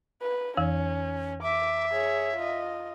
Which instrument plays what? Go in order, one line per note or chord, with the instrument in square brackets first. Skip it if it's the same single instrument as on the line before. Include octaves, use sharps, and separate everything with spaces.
[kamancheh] B4
[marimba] F2 E3 [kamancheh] C#4
[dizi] E5 [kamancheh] D6
[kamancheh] G#4 C#5
F4 D#5